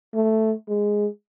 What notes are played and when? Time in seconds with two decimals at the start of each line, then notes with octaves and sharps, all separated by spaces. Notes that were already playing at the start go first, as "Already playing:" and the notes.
0.14 A3
0.69 G#3